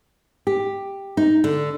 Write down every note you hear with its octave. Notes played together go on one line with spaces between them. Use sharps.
G4
D#4
D3